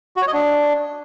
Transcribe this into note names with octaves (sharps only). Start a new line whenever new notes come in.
F#4
C#5
D#5
D4